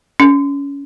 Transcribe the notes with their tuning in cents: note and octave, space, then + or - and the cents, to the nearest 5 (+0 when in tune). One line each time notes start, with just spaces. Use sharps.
C#4 +20